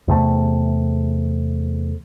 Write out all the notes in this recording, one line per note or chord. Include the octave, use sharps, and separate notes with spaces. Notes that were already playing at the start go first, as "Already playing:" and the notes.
E2 C3 A3